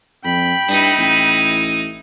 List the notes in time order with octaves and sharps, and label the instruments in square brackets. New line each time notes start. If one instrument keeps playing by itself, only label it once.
[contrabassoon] F2 [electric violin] G5 B5
[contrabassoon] G2 [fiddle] D#4 E4
[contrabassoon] A1